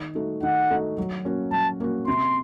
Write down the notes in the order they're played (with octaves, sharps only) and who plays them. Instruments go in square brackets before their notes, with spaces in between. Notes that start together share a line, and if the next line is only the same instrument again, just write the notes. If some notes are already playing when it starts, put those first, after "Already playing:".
Already playing: [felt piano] D#3
A3 D#4 F#4
[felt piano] D#3 [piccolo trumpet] F#5
[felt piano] A3 D#4 F#4
F#3
A#3 C#4 F#4
[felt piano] F#3 [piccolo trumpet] A5
[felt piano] A#3 C#4 F#4
[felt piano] C3 [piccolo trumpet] C6